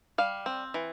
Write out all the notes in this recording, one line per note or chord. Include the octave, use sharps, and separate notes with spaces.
G3 F5
C4
E3